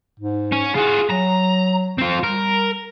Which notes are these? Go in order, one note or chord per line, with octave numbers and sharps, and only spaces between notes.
G#2
C#4
F4 F#4 G#4
F#3 A#5
C4 F4
G3 A#4